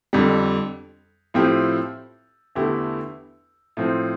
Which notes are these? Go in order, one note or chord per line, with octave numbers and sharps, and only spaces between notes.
F2 D3 G3
A2 F3 C4 E4 G4
E2 D3 A3 E4 G4
A2 F3 C4